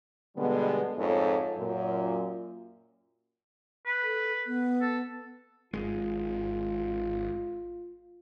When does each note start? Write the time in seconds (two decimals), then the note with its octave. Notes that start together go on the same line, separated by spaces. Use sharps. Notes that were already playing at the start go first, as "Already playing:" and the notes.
0.37 B2 D3 G3 G#3 B3
0.98 F2 G#2 A4 C#5
1.58 F#2 A#2
3.86 B4
4.02 A4
4.47 B3
4.81 A4
5.73 G#1 G#3 F4